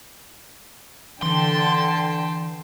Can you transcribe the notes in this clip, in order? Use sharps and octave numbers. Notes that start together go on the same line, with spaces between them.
D3 E3 G5 A5 C6